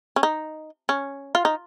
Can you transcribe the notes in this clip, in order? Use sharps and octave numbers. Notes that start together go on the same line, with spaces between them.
C#4
D#4
C#4
F4
D#4